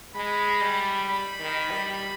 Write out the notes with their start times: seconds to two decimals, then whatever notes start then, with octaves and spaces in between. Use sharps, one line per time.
0.15 G#3 B5
0.62 G3
1.08 B5
1.40 D#3
1.71 G3